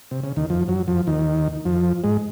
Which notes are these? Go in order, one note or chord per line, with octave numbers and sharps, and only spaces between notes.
C3
C#3
D#2 D#3
F2 F3
F#2 F#3
F2 F3
D#2 D#3
F2 F3
G#2 G#3